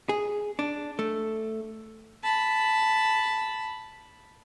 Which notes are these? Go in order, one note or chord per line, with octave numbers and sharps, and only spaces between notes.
G#4
D4
A3
A5 B5